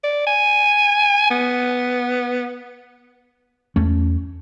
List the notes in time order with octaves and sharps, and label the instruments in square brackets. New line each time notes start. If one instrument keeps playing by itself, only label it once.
[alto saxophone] D5
G#5
B3
[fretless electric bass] E2 A3 C#4